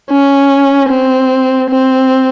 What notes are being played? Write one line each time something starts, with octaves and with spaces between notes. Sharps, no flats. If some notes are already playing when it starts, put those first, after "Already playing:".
C#4
C4
C4